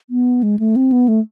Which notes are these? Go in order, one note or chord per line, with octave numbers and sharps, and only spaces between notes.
B3
G#3
A3
C4
B3
A3